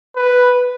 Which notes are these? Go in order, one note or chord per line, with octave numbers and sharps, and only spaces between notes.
B4